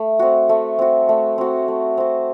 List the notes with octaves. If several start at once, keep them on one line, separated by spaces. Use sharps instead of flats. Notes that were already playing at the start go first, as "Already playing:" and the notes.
Already playing: A3
C4 F#4
A3
C4 F#4
A3
C4 F#4
A3
C4 F#4